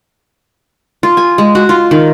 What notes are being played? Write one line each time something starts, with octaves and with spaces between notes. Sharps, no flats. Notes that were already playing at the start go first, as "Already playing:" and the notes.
F4
G#5
G#3
F#4
F4
D#3